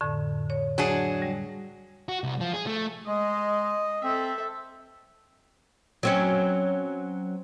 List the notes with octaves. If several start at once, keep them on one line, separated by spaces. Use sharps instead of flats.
F2 A2 D3
C#5
F#3 D4 G#4
G3
F#4
C2
F3
G#4
A3
G#3 D#5
C4 A4 E5
F#3 C4 C#4